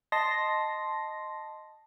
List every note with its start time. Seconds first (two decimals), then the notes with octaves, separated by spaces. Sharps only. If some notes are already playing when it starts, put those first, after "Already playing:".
0.12 D#5 A5 C6 A#6